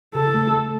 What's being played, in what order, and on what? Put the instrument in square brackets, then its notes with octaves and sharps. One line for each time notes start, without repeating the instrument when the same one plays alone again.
[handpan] C#3 [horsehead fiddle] A4
[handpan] A3
A3